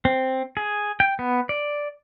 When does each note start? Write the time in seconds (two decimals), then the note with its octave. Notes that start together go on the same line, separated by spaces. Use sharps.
0.05 C4
0.57 G#4
1.00 G5
1.19 B3
1.49 D5